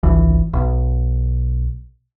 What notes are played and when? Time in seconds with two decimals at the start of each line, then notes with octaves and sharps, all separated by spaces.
0.03 G#1 C#2 E3
0.53 B1